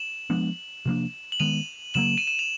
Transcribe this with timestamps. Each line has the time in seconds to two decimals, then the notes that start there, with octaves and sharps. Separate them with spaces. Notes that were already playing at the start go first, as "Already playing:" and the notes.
Already playing: E7 F#7
0.30 F3 G#3 B3 D4
0.85 C3 F3 A#3 D4
1.32 F#7
1.40 D#3 G#3 B3 D#7 F7
1.94 C#3 F#3 A#3 E7 F#7
2.18 D#7
2.28 E7
2.39 F7